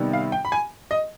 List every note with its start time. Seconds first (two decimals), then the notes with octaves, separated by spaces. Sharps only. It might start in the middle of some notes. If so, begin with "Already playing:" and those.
Already playing: C3 D#3 G3 B3
0.13 F5
0.32 G5
0.45 B5
0.52 G#5
0.91 D#5